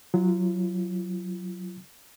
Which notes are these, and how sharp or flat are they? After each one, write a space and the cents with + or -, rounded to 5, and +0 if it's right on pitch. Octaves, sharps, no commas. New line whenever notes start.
F#3 -5 F4 -40